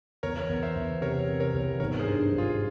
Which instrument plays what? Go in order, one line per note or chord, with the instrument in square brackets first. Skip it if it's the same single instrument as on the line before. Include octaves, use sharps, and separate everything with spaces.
[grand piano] E2 [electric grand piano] A#4 C#5
[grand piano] E2
[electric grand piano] C5 E5
[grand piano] E2
[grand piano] C3 [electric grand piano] A#4 C#5
[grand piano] C3
[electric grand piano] A#4 C#5
[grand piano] E2
[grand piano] G#1 [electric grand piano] A#4 C#5
[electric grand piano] G#4 C5
[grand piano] G2
G#1
[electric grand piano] F4 G#4